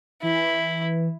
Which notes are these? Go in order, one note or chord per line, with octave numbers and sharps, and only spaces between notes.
E3 E4